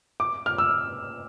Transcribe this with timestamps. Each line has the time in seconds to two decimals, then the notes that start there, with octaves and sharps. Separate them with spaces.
0.20 D6
0.46 F6
0.58 E6